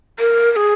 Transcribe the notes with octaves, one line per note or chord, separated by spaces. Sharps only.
A#4
A#4
G#4